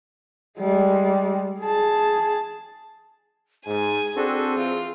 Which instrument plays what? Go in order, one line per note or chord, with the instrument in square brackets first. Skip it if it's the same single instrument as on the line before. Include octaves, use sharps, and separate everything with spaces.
[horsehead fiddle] G3 G#3
G#4 A5
[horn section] G#2 [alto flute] G#4 [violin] G#5
[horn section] C4 [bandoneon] D4 F#4 A4
[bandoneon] E3 [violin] F4